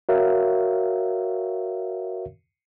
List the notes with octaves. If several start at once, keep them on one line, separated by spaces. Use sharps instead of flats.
F#4 A#4 C#5 E5 F5